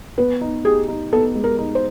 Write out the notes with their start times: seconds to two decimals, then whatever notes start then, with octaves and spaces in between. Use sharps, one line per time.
0.18 B3 B4
0.41 D#4
0.65 G4 G#4
0.88 D#4
1.12 B3 A4
1.35 G#3
1.44 A#4
1.59 D#4
1.75 C5